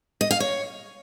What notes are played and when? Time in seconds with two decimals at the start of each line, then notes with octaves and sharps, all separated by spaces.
0.21 D#5
0.31 F5
0.40 C#5